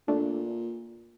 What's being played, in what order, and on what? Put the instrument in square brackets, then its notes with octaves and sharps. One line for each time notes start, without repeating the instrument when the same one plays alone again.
[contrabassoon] A#2 [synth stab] A3 D4